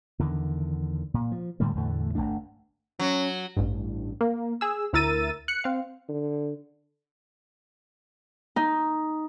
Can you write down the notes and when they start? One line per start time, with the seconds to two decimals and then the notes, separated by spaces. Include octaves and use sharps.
0.19 E2 D3 D#3
1.14 A#2
1.32 F3
1.60 A2 D3 G3 A3
1.75 E2 A2 D3 A3
2.15 G1 F2 A3 D4
2.99 F#3 C#4
3.57 A1 G2
4.21 A#3
4.61 G#4 E6
4.93 D2 E4 A#4 E6 A6 D#7
5.48 F#6 C#7
5.64 C4 F5
6.09 D3
8.56 D#4